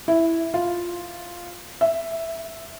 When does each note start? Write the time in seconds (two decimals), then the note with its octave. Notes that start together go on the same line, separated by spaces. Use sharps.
0.08 E4
0.54 F4
1.81 E5